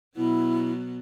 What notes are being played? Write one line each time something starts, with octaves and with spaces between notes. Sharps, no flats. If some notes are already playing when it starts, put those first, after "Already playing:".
B2 F#3 B3 E4